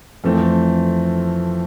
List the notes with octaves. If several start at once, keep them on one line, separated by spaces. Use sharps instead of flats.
F2 E3 A3 C4